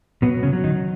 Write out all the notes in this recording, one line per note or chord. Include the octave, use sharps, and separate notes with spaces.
B2 F#3 B3
C#3 C#4
F#3
D#3 D#4